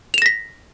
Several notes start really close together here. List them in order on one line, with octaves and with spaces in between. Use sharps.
F7 E7 A#6 B6